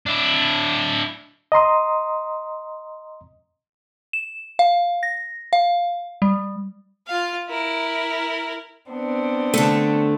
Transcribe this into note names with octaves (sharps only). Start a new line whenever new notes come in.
D4 E4
D#5 A#5 C6 D#6
E7
F5
A#6
F5
G3
F4 F5
E4 A#4
B3 C4 D4
D3 A3